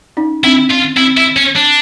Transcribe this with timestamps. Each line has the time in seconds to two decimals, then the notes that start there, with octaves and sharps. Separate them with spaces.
0.17 C#4 D#4
0.44 C4 D4 E4
0.71 C#4 F4
0.97 C4 E4
1.17 E4
1.37 C#4
1.56 D4